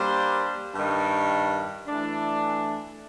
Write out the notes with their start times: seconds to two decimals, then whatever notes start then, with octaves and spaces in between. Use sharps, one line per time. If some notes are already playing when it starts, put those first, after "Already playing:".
Already playing: G3 A#3 D4 G4 C5
0.74 G2 D#3 G3
1.87 E3 A3 D4